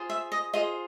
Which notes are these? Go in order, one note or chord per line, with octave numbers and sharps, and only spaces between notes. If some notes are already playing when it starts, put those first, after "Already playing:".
Already playing: F4 G#4 C5
E5
D#5
F4 G#4 C5 D#5